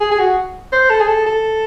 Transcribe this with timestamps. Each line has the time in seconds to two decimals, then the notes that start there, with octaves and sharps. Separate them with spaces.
0.01 G#4
0.11 G#4
0.19 F#4
0.72 C5
0.90 A4
1.00 G#4
1.08 A4
1.26 A4